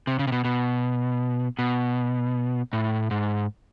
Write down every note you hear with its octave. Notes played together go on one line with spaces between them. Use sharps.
C3
C#3
C3
B2
B2
B2
A2
G#2